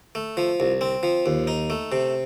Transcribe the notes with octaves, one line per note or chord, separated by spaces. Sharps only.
A3
F3
C2
C4
F3
D#2
D#4
A3
C3